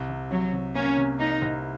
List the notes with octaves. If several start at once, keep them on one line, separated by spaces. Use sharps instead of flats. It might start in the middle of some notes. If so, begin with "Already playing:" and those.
Already playing: C2
C3
C3 F#3
C3
A#3 C#4
C3
A#3 D#4
C2